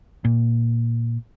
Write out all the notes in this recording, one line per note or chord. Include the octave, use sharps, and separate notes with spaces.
A#2